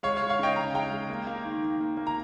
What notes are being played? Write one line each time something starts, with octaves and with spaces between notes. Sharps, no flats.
G#3 C#5 F5
C#5 F5
G#3
C#5 F5
C#3 D#5 G5
C#3 A#5
G#3 G5 A#5
G#3
A#3
A#3
D#3
D#3
A#3
A#3
A#5